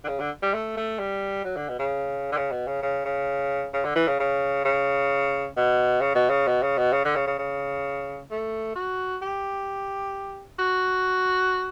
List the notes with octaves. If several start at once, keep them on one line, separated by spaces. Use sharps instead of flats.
D3
C#3
D3
G3
A3
A3
G3
F#3
D3
B2
C#3
D3
C#3
B2
C#3
C#3
C#3
C#3
D3
E3
C#3
C#3
C#3
B2
C#3
B2
C#3
B2
C#3
B2
C#3
D3
C#3
C#3
C#3
A3
F#4
G4
F#4